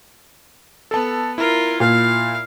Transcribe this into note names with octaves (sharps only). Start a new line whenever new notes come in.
B3 A4 A5
E4 F4 A#4
A#2 F5